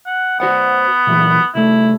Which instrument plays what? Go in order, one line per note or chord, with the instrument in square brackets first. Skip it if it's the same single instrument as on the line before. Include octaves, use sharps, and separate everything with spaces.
[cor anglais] F#5
[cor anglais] B3 [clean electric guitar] F#4 C5 F#5
[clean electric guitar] A#2 E3 F#3
[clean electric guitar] C2 A3 [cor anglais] E4